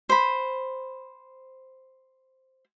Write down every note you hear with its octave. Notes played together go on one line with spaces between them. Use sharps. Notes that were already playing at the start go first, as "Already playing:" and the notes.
C5 B5